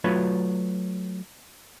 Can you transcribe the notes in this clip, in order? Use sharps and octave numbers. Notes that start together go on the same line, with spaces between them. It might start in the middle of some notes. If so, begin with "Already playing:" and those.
F#3 A3 F4 B4 C#5 B5